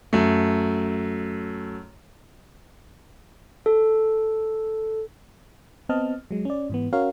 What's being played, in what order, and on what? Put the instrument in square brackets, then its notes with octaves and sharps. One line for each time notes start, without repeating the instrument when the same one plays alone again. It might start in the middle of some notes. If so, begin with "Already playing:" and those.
[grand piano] F#2 A3
[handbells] A4
[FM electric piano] B3 C4 D#5 A5 F6
F#3 G#3
C#4 D5
G#2 E3 B3
C#4 F#4 A#4 C#5 F5